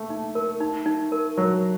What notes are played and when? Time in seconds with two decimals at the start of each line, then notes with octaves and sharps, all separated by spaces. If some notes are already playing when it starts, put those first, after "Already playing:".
Already playing: A3 A#3
0.10 D#4
0.35 A#4
0.60 D#4
0.86 D#4
1.12 A#4
1.37 F#3 A#4